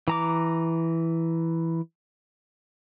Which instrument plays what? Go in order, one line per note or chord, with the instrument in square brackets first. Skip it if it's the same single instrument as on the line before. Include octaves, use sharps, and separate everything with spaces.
[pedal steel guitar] E3 A#5 D6